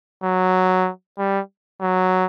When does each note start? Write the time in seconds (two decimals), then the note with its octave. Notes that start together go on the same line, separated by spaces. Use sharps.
0.24 F#3
1.18 G3
1.81 F#3